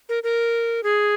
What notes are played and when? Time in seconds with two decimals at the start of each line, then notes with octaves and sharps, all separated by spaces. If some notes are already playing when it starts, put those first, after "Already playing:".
0.09 A#4
0.23 A#4
0.83 G#4